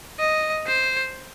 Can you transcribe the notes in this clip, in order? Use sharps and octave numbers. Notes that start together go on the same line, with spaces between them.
D#5
C5